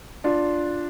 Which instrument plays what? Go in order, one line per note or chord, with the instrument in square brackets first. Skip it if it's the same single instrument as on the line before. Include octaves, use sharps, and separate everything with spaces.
[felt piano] D4 F4